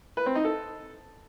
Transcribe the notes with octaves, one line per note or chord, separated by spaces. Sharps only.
B4
C4
D#4
A4